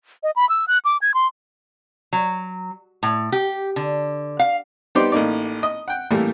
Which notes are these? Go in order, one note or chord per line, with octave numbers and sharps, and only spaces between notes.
D#5
B5
E6
F#6
D6
G#6
C6
F#3
A2
G4
D3
F5
G3 B3 D#4 G4 C5 D5
A1 A#3 D#4 D5
D#5
F#5 G5
A2 E3 G3 A3 A#3